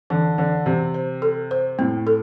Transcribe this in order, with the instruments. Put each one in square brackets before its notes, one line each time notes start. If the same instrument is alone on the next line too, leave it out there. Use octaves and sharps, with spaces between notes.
[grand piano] D3 [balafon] E3
[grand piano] D3 [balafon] E3
[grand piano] C3 [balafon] E3
[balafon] C5
A4
C5
[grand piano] A2 [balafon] C4
[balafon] A4